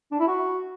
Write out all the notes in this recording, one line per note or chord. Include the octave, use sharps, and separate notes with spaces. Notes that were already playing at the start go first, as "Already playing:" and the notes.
D4
E4
F#4